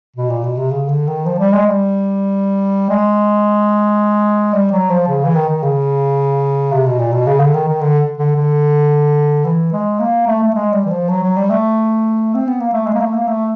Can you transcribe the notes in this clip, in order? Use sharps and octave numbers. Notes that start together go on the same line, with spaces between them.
B2
A#2
B2
C3
C#3
D3
D#3
F3
G3
G#3
G3
G#3
G3
F#3
F3
C#3
E3
D#3
D#3
C#3
C3
B2
A#2
B2
C#3
D3
D#3
D#3
D3
D3
D3
E3
G#3
A#3
A3
A3
G#3
G3
E3
F3
F#3
F#3
G3
A3
C4
B3
A#3
A3
G#3
A#3
A3
A#3
A3